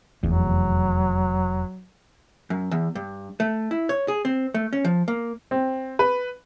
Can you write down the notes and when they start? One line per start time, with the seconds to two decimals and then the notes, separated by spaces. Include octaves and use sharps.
0.23 F1 E2 F#3
2.50 F#2
2.71 E2
2.95 G2
3.40 A3
3.71 E4
3.89 C#5
4.08 G#4
4.25 C4
4.54 A3
4.73 C#4
4.85 F3
5.08 A#3
5.51 C4
5.99 B4